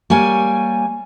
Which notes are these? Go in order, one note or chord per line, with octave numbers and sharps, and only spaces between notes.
G3 A#3 C#5 G#5